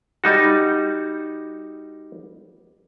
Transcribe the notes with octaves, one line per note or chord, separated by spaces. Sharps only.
G3 D#4 F#4